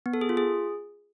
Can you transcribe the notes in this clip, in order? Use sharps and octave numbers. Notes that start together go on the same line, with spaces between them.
B3
A4
G#4
F4
G#4